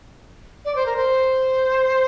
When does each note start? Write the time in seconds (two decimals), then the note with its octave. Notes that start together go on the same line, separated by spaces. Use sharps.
0.65 D5
0.76 C5
0.86 A#4
0.96 C5